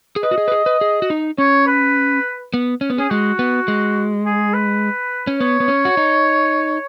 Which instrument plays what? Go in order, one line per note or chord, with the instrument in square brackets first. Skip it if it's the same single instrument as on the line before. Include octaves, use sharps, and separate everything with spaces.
[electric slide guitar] G#4
[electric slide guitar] B4 [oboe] D#5
[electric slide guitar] F#4
G#4
B4
G#4
B4
G#4
F#4
D#4
[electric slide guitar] C#4 [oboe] C#5
[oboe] B4
[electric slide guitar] B3
C#4
B3
[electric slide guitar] C#4 [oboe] G#4
[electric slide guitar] G#3 [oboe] F#4
[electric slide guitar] B3
G#3
[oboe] G#4
B4
[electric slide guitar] C#4
[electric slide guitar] B3 [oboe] C#5
[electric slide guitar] B3
C#4
F#4
D#4